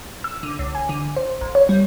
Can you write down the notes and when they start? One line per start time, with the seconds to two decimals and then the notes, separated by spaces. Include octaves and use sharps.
0.24 E6
0.43 D3
0.59 C#2
0.75 G#5
0.89 D3
1.16 C5
1.41 A1
1.55 C#5
1.69 G3